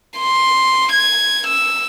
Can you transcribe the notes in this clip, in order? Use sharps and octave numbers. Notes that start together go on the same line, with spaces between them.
C6
G#6
E6